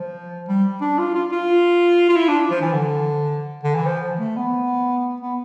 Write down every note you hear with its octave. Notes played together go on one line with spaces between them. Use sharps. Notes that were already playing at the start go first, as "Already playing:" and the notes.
Already playing: F3
G3
D4
F4
F4
F4
F4
E4
D4
F3
E3
D3
D3
E3
F3
A3
B3
B3